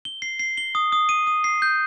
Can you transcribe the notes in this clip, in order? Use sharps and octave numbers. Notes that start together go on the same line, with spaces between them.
G7
C7
C7
G7
D#6
D#6
D#7
D#6
C7
G6